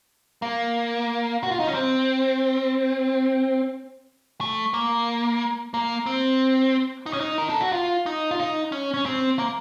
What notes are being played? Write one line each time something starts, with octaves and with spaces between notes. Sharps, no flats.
A#3
F#4
F4
D#4
C#4
C4
A3
A#3
A#3
C4
D#4
C#4
D#4
A#4
A4
F#4
F4
D#4
F4
D#4
C#4
C#4
C4
A#3